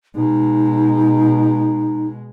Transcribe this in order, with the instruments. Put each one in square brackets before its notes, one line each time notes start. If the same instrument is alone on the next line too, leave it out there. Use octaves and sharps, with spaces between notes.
[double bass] B2 G#3 [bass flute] D#4